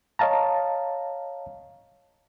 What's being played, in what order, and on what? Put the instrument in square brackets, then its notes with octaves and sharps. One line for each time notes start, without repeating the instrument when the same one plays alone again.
[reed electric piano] C#5 D#5 F5 A5 A#5